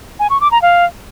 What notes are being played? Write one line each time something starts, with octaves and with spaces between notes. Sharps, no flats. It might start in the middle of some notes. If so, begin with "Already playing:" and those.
G#5
C#6
D6
A#5
F5